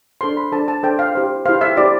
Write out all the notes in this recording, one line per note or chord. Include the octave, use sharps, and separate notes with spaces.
D4 A4 C5 C6
B5
D4 A4 C5 A5
A5
D4 A4 C5 G5
F5
E4 G4 C5
E4 G4 C5 F5
E5
E4 G4 C5 D5